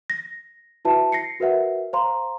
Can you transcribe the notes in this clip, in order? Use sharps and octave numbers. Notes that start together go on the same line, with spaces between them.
A#6
E4 F#4 B4 E5 A5
A#6 C7 C#7
F#4 A#4 B4 E5 F#5
C5 F5 A#5 C6